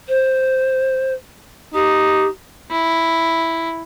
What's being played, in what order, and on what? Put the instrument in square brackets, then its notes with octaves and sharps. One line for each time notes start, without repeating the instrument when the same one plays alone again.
[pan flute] C5
[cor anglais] D#4 [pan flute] G4
[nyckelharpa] E4